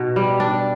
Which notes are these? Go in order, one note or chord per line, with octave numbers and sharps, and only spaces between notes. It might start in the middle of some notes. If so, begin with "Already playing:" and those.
Already playing: B2 D#4
G3
D4